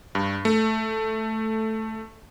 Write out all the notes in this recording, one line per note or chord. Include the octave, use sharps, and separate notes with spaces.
G2
A3